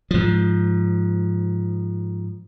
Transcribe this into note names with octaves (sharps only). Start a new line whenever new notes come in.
G#2 F3